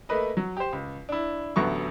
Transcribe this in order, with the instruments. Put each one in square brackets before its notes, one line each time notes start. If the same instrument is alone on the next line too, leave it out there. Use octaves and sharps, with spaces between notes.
[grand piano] A3 A#3 B4 D#5
F#3
G4 C5
C#2
D4 E4
A1 D2 F#3 B3 A4 C#6